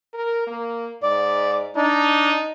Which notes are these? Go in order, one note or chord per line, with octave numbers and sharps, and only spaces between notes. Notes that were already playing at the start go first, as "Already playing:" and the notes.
A#4
A#3
G#2 D5
D4 D#4